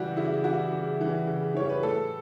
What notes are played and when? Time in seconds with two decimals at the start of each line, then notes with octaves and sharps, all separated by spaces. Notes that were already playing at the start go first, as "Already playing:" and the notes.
Already playing: C#3 E3 G3 F#4 G4
0.16 C#3 E4
0.44 E3 G3 F#4
0.72 C#3
1.00 E3 G3
1.27 C#3
1.55 E3 G3 C#5
1.70 B4
1.83 A2 A4